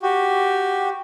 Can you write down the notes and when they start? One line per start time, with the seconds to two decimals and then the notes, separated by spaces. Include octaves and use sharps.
0.02 F#4 G4